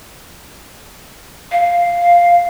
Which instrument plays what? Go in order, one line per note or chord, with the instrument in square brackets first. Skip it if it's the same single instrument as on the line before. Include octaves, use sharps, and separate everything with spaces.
[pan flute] F5